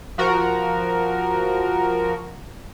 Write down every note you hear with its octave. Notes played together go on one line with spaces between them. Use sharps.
F3 F#4 A#4